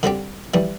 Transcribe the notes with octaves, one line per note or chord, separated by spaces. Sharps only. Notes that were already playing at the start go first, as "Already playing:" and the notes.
D3 G3 C4 G4
E3 G3